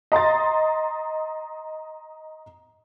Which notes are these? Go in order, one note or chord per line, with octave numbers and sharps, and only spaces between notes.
D#5 A#5 C6 A6